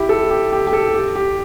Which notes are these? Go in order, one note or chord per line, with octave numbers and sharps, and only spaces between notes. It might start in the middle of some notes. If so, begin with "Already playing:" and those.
Already playing: E4 G4
A4
G4
G4
G4
A4
G4
G4